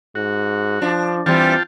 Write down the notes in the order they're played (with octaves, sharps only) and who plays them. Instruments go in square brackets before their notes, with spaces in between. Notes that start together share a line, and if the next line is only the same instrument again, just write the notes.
[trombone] G#2 [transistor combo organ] F#4
[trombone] F3 [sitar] D4
[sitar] E3 G3 [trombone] C4 [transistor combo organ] F4 G5 A5